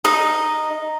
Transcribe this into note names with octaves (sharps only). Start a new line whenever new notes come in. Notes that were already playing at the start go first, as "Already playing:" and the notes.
D#4 D#5 A#5